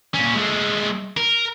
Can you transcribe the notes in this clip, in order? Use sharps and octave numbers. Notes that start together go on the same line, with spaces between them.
A#2 C#4
G#3 A3
A#4